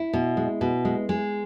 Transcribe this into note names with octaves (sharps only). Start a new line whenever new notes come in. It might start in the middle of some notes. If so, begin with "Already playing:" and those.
Already playing: E4
B2
G#3
B2
G#3
G#3